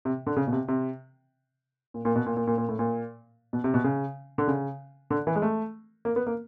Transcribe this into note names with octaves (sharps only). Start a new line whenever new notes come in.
C3
D3
C#3
B2
C3
C3
A#2
A#2
B2
A#2
A#2
A#2
A#2
A2
A#2
B2
C3
B2
C#3
D3
C#3
D3
E3
G#3
A3
A#3
B3
A#3